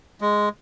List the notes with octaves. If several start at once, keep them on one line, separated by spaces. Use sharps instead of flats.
G#3